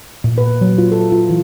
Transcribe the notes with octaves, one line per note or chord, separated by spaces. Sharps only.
A#2
B4
F#3
F4
A4
F4
E3